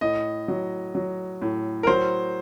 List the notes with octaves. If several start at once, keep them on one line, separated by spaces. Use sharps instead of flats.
A2 D#5
F#3
F#3
A2
A#4
F#3 C5